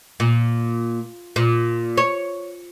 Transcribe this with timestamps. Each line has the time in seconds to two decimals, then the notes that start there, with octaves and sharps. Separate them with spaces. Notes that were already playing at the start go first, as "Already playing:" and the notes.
0.20 A#2
1.36 A#2
1.97 C#5